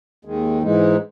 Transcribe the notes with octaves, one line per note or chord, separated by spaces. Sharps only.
D#2 D#3 G#3
G#2 E3 G#3 D#4